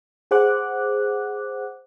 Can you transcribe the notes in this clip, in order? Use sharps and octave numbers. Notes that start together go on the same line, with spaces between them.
G#4 C5 F#5 D6 F#6